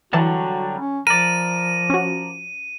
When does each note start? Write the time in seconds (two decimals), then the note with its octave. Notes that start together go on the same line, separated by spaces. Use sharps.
0.13 D3 E3 F#3 G3 F#4 A5
0.77 C#4
1.07 F3 A#4 D5 D#7
1.90 C#4 F#4